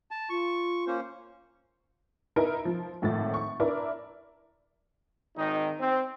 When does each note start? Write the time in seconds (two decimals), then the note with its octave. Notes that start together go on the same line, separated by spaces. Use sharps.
0.11 A5
0.30 F4 C#6
0.87 A#3 C#4 C5
2.36 D#4 E4 A#4 D7
2.65 F3
3.02 G#1 A2 F3 A6
3.34 C#6
3.60 D4 E4 A#4 D5
5.36 G#1 D#3 D#4
5.80 C4